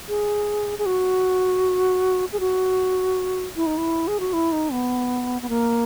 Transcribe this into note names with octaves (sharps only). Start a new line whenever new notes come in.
G#4
G#4
F#4
G#4
F#4
E4
D#4
E4
G#4
F#4
E4
D#4
B3
B3
A#3